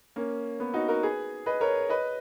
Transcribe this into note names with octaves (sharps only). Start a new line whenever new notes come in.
A#3 C#4
B3
D#4 F#4
F#4 A#4
G#4 B4
B4 D#5
A#4 C#5
B4 D#5